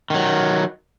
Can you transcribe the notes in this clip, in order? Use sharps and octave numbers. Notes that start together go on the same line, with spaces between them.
D#3 F#3